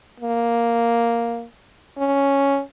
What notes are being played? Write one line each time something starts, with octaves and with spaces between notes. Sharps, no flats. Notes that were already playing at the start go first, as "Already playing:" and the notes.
A#3
C#4